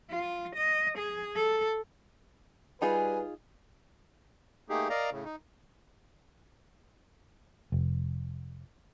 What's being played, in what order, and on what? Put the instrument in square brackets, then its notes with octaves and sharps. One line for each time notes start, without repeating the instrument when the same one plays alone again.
[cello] F4
D#5
G#4
A4
[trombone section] G3 B4 [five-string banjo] D#4 F4 G#4 [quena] G#5
[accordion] A3 A#3 D#4 G4 G#4
A#4 D5 D#5 F5 A#5
A2 C#3
D#4
[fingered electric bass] F1